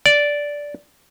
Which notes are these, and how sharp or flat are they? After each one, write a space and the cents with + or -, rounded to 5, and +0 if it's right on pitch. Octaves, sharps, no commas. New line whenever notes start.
D5 -10